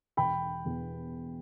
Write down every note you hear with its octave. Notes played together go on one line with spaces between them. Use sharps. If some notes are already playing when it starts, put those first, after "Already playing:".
E1 G5 B5
E2 B2